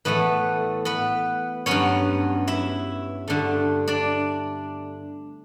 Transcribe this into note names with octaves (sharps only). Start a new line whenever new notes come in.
A2 E3 A3 B3 B4
B3 B4
G2 F#3 B3 C#4 C#5
E4 E5
G2 D3 A3
D4 D5